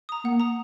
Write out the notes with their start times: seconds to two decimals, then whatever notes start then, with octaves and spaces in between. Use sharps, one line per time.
0.09 A#5 D#6
0.24 A#3 F#5
0.40 A#5 D#6